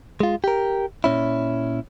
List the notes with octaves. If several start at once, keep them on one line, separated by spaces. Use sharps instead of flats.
G#3 F4
G4 A#4
A#2 C#4 E4